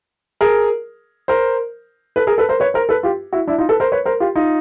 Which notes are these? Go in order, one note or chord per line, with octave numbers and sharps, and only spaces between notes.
G#4 A#4
A#4 C5
A4 B4
G#4 A#4
A4 B4
A#4 C5
B4 C#5
A#4 C5
A4 B4
F4 G4
E4 F#4
D4 E4
D#4 F4
A4 B4
A#4 C5
B4 C#5
A#4 C5
F4 G4
D#4 F4